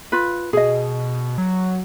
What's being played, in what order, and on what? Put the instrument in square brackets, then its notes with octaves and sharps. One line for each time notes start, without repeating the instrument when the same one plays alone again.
[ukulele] F4 B4
[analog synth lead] B2 [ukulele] G#4 D#5
[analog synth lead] F#3